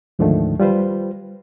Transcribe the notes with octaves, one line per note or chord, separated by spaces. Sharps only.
D2 G#2 D3 D#3 F3 A3
G3 F4 B4 C5